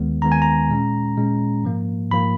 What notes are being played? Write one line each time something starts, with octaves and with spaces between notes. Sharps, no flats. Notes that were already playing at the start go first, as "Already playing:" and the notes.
Already playing: D#2 D#3 G#3 B3
D#2 D#3 G#3 B3 A#5
G#5
A#5
A#2 G#3 C#4
A#2 G#3 C#4
G#2 F3 A#3
G#2 F3 A#3 B5